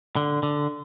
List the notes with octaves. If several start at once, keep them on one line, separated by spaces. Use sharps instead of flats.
D3
D3